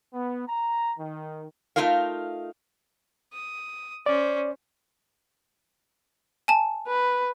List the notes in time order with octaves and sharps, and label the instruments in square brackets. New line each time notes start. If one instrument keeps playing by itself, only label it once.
[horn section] B3
A#5
D#3
[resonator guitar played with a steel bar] A3 A#3 D#4 F4 A#4 F5
[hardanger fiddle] D#6
[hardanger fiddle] C#4 C5 [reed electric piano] D5
[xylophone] G#5 A5
[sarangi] B4